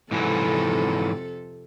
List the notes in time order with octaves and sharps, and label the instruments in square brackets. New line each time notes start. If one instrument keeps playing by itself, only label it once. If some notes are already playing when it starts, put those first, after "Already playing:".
[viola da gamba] F2 C3 A4 [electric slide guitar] G#2 E3 F#3